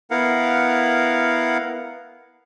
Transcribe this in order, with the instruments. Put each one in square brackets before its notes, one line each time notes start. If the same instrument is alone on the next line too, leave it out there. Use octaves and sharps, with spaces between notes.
[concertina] B3 E4 A#4 F5 F#5